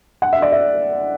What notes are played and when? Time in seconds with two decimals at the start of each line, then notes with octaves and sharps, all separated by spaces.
0.22 F#5
0.33 E5
0.42 D5
0.52 E5